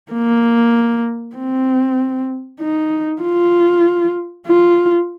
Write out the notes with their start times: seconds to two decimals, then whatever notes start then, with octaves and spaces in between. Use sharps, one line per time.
0.12 A#3
1.36 C4
2.60 D#4
3.22 F4
4.47 F4